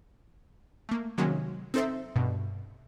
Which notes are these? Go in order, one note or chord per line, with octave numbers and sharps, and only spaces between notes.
A3 A#3
C3 D#3 F#3 G#3 A#3 C#4
C4 D#4 A4 C5 E5
G2 B2